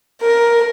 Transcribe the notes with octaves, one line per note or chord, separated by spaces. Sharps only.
A#4